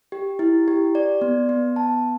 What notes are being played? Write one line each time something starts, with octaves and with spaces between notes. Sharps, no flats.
G4
E4
G4
D5
B3
B3
A5